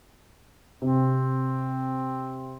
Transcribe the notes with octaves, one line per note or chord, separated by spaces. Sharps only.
C3 C4